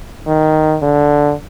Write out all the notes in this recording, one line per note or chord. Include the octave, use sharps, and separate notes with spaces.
D#3
D3